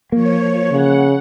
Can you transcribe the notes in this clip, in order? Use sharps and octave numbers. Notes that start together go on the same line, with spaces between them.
F3 A#3 C#5
C#3 F#5